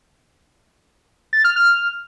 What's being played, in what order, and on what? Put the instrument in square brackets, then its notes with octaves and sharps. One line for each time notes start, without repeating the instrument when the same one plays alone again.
[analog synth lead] A6
F6
F6